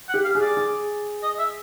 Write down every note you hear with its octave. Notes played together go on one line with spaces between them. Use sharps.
F#5
G4
F5
G#4
D5
G#4
D#5
E5